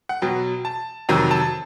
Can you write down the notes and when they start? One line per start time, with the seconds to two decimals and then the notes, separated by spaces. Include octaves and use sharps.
0.09 F#5
0.22 B2 F#3 G5
0.65 A5
1.09 F2 C3 D#3 F#3 A#5
1.31 A5